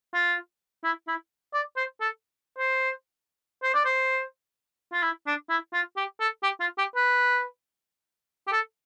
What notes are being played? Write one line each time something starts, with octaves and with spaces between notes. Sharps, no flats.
F4
E4
E4
D5
C5
A4
C5
C5
D5
C5
F4
E4
D4
E4
F4
G4
A4
G4
F4
G4
B4
G4
A4